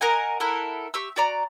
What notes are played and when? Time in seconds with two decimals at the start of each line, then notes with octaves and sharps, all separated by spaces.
0.01 A#4 D#5 F#5 G#5
0.40 E4 A4 A#4 F#5
0.94 G4 C#6 E6
1.16 F#4 D5 A#5